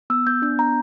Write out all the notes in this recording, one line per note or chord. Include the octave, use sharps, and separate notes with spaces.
B3 E6
B3 G6
D4 G6
B3 A#5